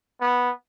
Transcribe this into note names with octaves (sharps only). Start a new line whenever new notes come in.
B3